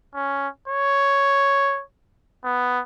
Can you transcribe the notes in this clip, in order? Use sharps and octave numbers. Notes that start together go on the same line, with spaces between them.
C#4
C#5
B3